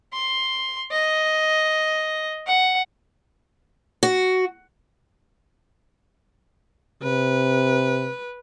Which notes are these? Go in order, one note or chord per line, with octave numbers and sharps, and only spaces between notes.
C6
D#5
F#5
F#4
C3 B4